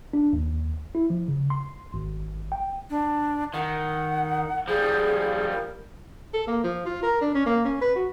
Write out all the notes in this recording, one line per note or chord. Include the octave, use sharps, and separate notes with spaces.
D4
D#2
E4
F3
C#3
C6
G#1
G5
D4
D#3 F#5
F3 G3 G#4
A#4
A4
A#3
F3
F4
A#4
D4
C#4
A#3
C#4
B4
F#4